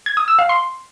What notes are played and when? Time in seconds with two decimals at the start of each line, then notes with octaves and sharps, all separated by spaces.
0.06 G#6
0.17 D#6
0.28 E6
0.39 F5
0.49 C6